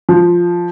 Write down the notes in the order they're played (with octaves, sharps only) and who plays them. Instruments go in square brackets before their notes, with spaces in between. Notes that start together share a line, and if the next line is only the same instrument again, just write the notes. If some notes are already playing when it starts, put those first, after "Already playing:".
[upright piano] F3